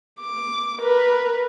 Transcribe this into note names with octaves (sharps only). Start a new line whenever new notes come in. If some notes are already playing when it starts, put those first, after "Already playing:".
D6
A#4 B4